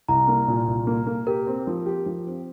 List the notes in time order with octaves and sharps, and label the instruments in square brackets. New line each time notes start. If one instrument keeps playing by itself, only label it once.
[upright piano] C2 [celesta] A#5
[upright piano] A#3
A#2
C2
A#3
A#3
[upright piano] G4 [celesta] A#4
[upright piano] C4
F3
G4
F3
C4